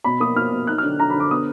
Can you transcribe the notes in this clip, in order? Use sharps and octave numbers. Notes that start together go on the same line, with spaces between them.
B2 B5
A#3 D#6
A#3 F6
B2
D#4 F#6
F6
D3
D3 A#5
B5
D3
D6
B3 D#6